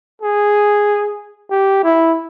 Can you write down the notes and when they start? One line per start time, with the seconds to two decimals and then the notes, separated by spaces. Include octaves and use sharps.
0.22 G#4
1.51 G4
1.84 E4